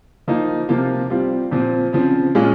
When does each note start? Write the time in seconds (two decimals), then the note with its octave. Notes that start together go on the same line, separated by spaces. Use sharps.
0.28 F3 A#3 D#4
0.69 C3 F3 A#3 F4
1.10 G3 C4 F4
1.51 A#2 F3 C4
1.93 C#3 F3 C4
2.35 A#2 G#3 C#4 F4